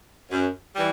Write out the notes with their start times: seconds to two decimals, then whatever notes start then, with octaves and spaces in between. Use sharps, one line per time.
0.30 F#2
0.75 E3 G3